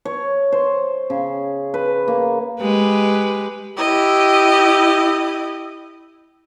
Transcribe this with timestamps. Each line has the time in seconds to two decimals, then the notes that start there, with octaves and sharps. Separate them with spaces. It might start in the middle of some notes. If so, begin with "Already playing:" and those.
0.05 C#5
0.52 C5
1.10 C#3
1.74 B4
2.08 A#3
2.61 G#3 G4 B4
3.78 E4 G4 D#5